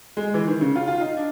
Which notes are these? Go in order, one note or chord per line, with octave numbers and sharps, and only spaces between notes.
G#3
E3
D#3
C#3
F4
F4
D#4
D4